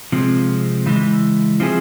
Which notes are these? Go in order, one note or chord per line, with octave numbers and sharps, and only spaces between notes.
C3 F3 G#3 C4
C#3 E3 G#3
F3 C4 E4 G#4